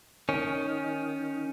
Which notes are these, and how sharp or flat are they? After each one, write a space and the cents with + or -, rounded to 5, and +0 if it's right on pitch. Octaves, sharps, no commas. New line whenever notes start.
D#3 +0 C#4 +0